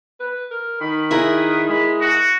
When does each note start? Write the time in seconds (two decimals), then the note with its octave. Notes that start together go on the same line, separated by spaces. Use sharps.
0.20 B4
0.51 A#4
0.81 D#3 B5
1.11 E4 G#4 A#4 B4
1.69 G#3 B5
2.01 F#4